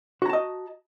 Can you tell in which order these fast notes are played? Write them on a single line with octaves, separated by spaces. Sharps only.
F#4 A#5 A5 D#5